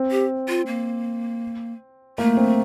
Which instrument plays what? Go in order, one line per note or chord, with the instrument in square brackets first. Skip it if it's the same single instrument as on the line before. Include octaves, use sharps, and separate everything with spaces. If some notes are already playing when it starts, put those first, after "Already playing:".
Already playing: [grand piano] C4
[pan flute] G4
F4
A#3
[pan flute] A3 [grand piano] A#3
[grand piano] C4